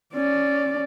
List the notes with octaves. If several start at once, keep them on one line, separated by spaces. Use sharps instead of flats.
C#4 D5